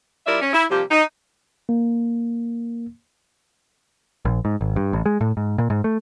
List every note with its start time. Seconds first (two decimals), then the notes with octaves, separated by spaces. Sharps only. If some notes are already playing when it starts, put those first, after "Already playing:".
0.26 G3 E4 F4 A#4 D5 E5
0.42 C#4
0.53 E4
0.70 C3 F3 G3 A#3 G4
0.91 D#4
1.69 A#3
4.25 A#1
4.45 G#2
4.61 G#1
4.76 G2
4.93 A1
5.06 G#3
5.21 A2
5.37 G#2
5.58 A#2
5.70 G#2
5.84 A3